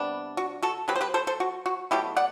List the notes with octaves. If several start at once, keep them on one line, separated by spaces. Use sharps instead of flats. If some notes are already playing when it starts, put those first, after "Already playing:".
Already playing: C3 G3 B3 D4
F#4
F#4 A4
F#3 C4 G4 B4
C5
G4 B4
A4 C5
A4 C5
F#4
F#4
B2 F#3 A3 E4 G4
D5 F#5